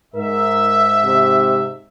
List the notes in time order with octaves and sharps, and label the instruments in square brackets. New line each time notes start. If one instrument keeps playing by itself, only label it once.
[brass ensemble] G#2 E5 [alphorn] A#4
[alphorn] C3